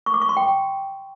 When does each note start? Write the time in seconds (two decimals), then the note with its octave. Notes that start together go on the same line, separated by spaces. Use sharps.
0.06 C#6
0.14 D6
0.22 C#6
0.29 C6
0.37 G5